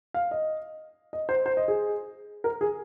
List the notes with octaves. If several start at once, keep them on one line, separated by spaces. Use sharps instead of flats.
F5
D#5
D#5
C5
C5
D#5
G#4
A#4
G#4